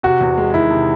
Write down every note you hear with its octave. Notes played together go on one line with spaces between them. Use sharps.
C3 F#4
E2
G#3
D#3 E4
C3